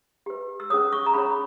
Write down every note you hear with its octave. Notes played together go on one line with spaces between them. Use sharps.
G4 B4
E6
C#4 G#4 C#5 D#6
C#6
A#5
C#4 G#4 C#5 B5